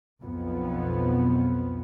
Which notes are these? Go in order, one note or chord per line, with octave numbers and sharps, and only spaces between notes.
B1 F2 B3